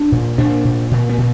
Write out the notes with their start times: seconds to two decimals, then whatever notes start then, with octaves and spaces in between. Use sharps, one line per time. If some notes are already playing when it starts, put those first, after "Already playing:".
Already playing: D4
0.12 A#2
0.38 A#2 D4
0.65 A#2
0.91 A#2
1.09 B3
1.18 A#2